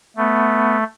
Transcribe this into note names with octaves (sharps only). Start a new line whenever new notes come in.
A3 B3